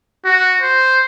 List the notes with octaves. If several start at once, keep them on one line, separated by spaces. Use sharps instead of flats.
F#4
C5